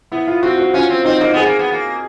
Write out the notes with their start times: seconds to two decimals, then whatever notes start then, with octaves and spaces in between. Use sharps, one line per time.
0.12 B3 E4
0.27 F4
0.43 C4 F#4
0.58 F#4
0.74 C#4 F4
0.90 C4
1.05 C4 D#4
1.20 A#3 D#4
1.33 B3 G#4
1.46 A#3
1.59 B3
1.72 A#3